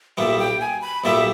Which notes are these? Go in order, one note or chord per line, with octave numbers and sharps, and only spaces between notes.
B1 A#2 G3 B3 E5
G5
G#5
B5
B1 A#2 G3 B3 E5